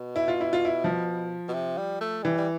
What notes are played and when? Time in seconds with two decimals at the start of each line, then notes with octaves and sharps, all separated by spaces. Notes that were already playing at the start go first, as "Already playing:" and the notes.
Already playing: B2
0.16 E4
0.28 F4
0.41 E4
0.53 F4
0.65 E4
0.84 F3
1.48 B2
1.54 C3
1.78 G3
2.01 A3
2.23 E3 G3
2.38 G3